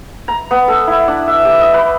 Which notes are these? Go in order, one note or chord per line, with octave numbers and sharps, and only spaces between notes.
A#5
B3
A4
E4
D4
E5
G4
D#5
B4